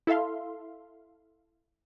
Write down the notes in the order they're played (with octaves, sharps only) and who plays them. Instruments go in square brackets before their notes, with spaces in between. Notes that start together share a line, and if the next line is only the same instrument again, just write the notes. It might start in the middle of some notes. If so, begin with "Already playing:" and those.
[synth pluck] E4 A4 E5 F5 C6